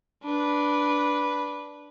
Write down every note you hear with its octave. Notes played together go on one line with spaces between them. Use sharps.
D4 B4